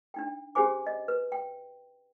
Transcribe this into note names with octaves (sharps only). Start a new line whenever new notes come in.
D4 D#4 G5
C#4 G4 G#4 C5 G#5 D6
D#5
B4
G5